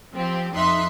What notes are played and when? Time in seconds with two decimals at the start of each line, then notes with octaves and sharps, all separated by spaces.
0.13 F3 C4 G4
0.54 F2 D#4 E5 C6 F#6